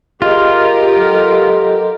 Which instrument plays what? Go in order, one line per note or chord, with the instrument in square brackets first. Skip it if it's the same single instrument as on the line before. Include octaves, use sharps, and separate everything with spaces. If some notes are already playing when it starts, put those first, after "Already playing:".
[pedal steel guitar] F4 [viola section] G4 A#4 [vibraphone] G#4 D#5
[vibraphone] F#3 A4 D#5